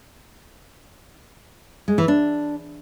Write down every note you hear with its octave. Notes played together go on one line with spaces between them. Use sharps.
G#3
E3
D4